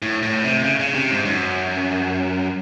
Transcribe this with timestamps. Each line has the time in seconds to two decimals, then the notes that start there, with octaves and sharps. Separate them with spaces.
0.02 A2
0.23 A2
0.44 C3
0.64 C#3
0.80 C#3
0.94 C3
1.10 G#2
1.25 F#2